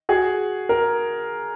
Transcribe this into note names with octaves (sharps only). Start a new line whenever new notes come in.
F#4 G#4
A#4